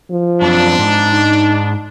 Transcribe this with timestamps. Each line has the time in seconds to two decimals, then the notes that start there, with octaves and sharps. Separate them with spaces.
0.11 F3
0.42 F#2 C4 D4
0.79 G#2
1.11 D#4